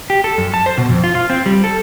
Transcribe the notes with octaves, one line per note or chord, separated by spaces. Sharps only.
G4
A4
F#2
A5
C5
B2
F2
F4
F4
C4
G3
A4